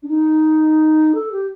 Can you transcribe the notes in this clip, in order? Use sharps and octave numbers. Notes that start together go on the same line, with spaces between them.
D4
D#4
A4
G4